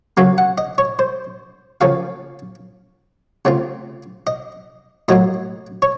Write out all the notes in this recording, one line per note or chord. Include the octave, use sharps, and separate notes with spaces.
C#3 F#3 A#3 C#4 F5
F#5
D#5
C#5
C5
C#3 F3 A#3 C#4 F5
C#3 A3 C4 F4
D#5
A2 F#3 A#3 D#5
C#5